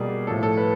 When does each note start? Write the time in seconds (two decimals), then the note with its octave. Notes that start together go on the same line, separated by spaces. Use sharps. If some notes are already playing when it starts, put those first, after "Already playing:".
Already playing: B2 G3 A#3 G#4
0.27 A2 F3 A3 A4
0.43 A4
0.57 B4